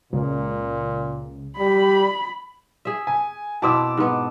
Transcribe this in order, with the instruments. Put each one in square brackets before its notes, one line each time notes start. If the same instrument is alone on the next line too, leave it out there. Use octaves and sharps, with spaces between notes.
[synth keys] C#2 [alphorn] A#2
[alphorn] G3 [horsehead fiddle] B5
[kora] G#4 E5
[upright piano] G#5
[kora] B2 C4 E4 [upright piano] A5 D6 E6
[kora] G#2 B3